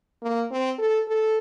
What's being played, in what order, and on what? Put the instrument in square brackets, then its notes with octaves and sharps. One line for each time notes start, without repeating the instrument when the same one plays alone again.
[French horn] A#3
C4
A4
A4